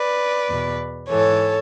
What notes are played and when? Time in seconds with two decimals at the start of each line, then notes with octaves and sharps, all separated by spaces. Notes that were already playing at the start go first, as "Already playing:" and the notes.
Already playing: B4 D5
0.48 E2 B2
1.10 G#2 E3 A4 C#5